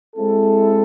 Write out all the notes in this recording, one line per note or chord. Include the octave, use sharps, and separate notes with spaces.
G#3 C4 E4 A4